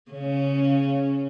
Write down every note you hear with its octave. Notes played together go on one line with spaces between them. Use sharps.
C#3 C#4